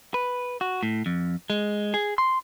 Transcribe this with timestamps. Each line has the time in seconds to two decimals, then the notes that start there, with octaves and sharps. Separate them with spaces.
0.14 B4
0.61 F#4
0.83 A2
1.06 F2
1.50 G#3
1.94 G#4
2.18 C6